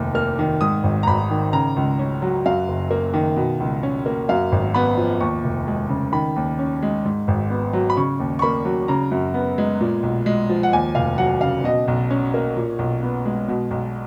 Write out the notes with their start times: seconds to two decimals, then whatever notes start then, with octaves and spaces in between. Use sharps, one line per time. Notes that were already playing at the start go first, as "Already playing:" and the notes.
Already playing: F1 D#2 D#3
0.15 A#3 F6
0.39 D#3
0.61 G#2 D#6
0.84 G#1
1.03 A#5
1.07 G#1 B5
1.31 D#3
1.53 C#3 A#5
1.76 C#2
1.99 C#4
2.22 F#3
2.46 F#2 F5
2.68 F#1
2.91 A#3
3.14 D#3
3.36 B2
3.60 C#2
3.83 C#4
4.06 A#3
4.29 F#2 F5
4.52 G#1
4.74 B3 B5
4.97 F3
5.20 D#2 C#6
5.44 F1
5.67 G#3
5.90 C#3
6.13 D#3 B5
6.36 D#2
6.59 C#4
6.82 G#3
7.05 G#2
7.28 G#1
7.50 B3
7.73 F#3
7.90 B5
7.97 C#3 C#6
8.20 D#2
8.39 C#6
8.42 A#3 B5
8.65 F#3
8.88 C#3 A#5
9.11 F#2
9.34 B3
9.58 G#3
9.81 A#2
10.03 B1
10.26 G#3
10.49 F3
10.63 F#5
10.73 D#2 G#5
10.95 F1 F5
11.18 F#3 F#5
11.41 C#3 F5
11.64 B2 D#5
11.88 B1
12.11 C#4
12.34 A#3
12.56 A#2
12.79 B1
13.03 B3
13.25 G#3
13.48 B2
13.71 B1